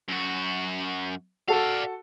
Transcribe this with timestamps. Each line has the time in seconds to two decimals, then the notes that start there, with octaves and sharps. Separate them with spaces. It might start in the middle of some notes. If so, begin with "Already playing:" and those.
0.08 F#2 F#4
1.48 F#4 A4 D5 F5